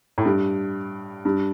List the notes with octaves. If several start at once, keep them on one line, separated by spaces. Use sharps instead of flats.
A2
G2
G2